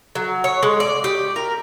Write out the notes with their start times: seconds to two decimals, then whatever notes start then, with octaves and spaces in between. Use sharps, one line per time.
0.15 F#3
0.44 C#5
0.63 G#3
0.80 D5
1.04 G4
1.36 A#4